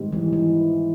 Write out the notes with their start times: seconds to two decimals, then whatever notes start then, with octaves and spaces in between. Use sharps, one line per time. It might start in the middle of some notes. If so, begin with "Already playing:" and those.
Already playing: G#2 D#3 G3 C4
0.12 E3
0.33 E3